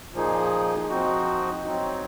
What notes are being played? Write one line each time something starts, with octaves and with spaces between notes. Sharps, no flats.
A#2 F3 A#3 D#4 G#4
F3 C4 D#4 F#4
F#3 C4 D#4